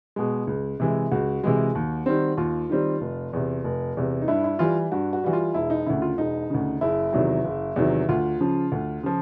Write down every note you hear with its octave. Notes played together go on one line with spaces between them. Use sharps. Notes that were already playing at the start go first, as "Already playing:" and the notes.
B2 G#3
C#2
C3 E3 G#3
C#2 F#4
C3 E3 G#3
D#2
D#3 G3 C4
D#2 F4
D#3 G3 C4
F1
E2 C3
F1
E2 C3
D#4
G2 E4
E4
E3 G3 F4
G2 F#4
F#4
E3 G3 F#4
F4
E1 E4
D#4
D2 C#3 E4
F4
E1 D#4
D2 C#3
F#1 E4
E2 C3 D#3 F#3
F#1
E2 C3 D#3 F#3
D2 F4
C#3 F3
D2
C#3 F3